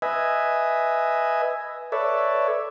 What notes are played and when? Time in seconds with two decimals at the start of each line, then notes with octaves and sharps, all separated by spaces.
0.02 B4 D#5 E5 G#5
1.92 A4 B4 C#5 D5 E5